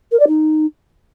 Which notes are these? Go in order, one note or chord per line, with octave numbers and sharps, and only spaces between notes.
A#4
D5
D#4